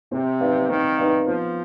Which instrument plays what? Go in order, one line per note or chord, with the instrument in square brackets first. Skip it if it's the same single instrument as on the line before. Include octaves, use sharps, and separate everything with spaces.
[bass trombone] C3 [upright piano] C4
[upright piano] D#4 B4 D5 F5
[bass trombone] D#3 [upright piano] C4
[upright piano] D#4 B4 D5 F5
[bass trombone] F3 [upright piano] B3